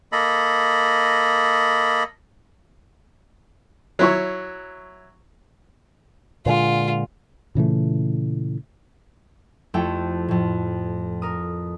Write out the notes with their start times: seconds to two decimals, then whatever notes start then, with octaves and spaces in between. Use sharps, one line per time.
0.12 A#3 A4 D#5 B5
3.99 F#3 E4 C#5
6.46 A#2 D3 G#3 F4
7.55 A#2 C#3 E3 A3
9.74 F2 A3 E4 G4 G5
10.28 F2 A2
11.22 A#4 D#6